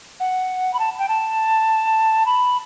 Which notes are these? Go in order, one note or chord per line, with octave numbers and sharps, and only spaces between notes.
F#5
B5
A5
G5
A5
B5